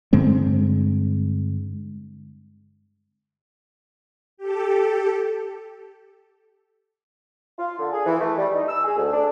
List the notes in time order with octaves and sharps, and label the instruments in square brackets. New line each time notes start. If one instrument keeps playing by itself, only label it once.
[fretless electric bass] G2 D3 G#3 C4
[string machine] G4 A4
[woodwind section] F4
D3
G#4
E3
A3
G3
D#4
E6
G#4
D2
D4